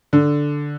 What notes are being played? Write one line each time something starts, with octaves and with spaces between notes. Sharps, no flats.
D3